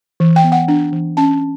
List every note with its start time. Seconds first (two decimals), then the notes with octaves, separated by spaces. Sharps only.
0.20 E3
0.36 G5
0.44 B3
0.52 F#5
0.68 D4
0.93 E3
1.17 C#4 A5
1.41 C#4